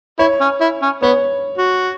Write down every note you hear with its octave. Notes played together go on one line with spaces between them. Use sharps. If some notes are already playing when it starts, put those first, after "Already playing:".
E4 C#5
C#4
E4
C#4
B3 C#5
F#4